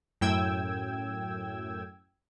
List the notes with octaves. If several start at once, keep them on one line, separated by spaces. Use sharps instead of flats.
F#2 A2 G5 E6 G#6